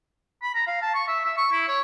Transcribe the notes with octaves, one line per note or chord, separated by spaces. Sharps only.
B5
A#5
F5
A5
C#6
E5
E5
C#6
E4
C#5